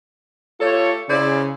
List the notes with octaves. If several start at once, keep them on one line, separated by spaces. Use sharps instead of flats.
A3 F4 G4 A4 C#5
C#3 E4 C5 D5